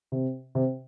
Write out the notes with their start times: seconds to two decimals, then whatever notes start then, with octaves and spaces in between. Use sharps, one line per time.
0.12 C3
0.55 C3